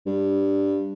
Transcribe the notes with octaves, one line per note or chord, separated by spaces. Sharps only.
G2